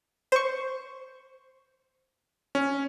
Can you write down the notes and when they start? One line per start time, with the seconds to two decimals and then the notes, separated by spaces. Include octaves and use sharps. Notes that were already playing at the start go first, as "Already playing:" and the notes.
0.32 C5 C#6
2.55 C#4